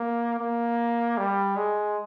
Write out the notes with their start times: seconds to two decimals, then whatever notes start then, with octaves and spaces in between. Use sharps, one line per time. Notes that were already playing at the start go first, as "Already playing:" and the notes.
Already playing: A#3
0.39 A#3
1.18 G3
1.56 G#3